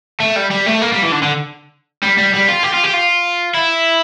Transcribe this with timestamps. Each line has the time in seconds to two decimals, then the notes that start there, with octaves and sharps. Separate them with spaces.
0.20 A3
0.36 G3
0.50 G3
0.66 A3
0.81 A#3
0.92 G3
1.02 E3
1.12 D3
1.22 D3
2.03 G3
2.18 G3
2.34 G3
2.49 F4
2.63 G4
2.74 F4
2.84 G4
2.94 F4
3.54 E4